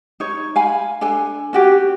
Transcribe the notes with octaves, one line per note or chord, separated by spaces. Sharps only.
D#4 C#5
F5 G#5 B5
D4 A4 G#5
C#4 F#4 G4